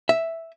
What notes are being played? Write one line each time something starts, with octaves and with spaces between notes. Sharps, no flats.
E5